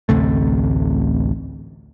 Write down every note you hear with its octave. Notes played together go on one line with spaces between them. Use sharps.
A1 D2 C3 A3